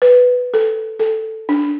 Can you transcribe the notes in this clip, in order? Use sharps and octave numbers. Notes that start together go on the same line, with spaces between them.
B4
A4
A4
D4